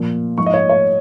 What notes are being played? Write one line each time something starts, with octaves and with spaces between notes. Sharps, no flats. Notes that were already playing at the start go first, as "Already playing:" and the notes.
Already playing: A#2 F3
G#2 F3 C#6
D#5
C#5
C#5